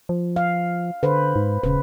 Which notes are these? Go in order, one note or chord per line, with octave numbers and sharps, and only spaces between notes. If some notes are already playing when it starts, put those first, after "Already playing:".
F3
F5
D3 B4 C5
G#2
D#1 C#3 B4